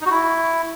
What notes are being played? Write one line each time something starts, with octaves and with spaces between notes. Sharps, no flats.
D#4
F#4
E4